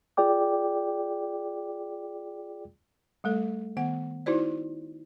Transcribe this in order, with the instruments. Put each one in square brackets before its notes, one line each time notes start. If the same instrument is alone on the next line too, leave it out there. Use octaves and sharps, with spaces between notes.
[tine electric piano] F4 G#4 D5 G5 D6
[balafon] G3 A3 A4
D#3 B3 F#5
D#4 E4 F#4 C5 D5